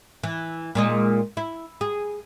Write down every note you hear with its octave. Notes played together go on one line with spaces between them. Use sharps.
E3
A#2 G#3 D#4
E4
G#4